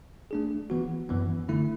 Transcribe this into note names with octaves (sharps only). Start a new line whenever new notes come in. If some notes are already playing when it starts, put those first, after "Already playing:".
A3 D4 G#4
E3 B3 F#4
F#2 E3 B3
D3 A3 E4